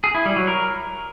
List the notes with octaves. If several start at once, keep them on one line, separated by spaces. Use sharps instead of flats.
G#4
E4
G3
F#3
A#4